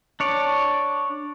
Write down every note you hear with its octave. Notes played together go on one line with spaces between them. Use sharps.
D4 C#5 D5